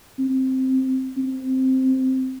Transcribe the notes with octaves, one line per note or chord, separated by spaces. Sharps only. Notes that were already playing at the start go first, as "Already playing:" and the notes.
C4
C4